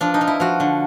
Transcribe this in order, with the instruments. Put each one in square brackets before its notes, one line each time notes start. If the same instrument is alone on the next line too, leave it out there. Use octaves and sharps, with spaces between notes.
[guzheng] F3 D4
D#4
F3
E4
F3 F#4
D3